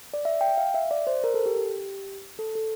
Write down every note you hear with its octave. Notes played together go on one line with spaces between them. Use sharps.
D5
E5
G5
F5
E5
D5
C5
A#4
A4
G4
G4
A4
A4